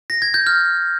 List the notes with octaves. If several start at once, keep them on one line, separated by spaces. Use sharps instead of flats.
A#6
G#6
G6
F6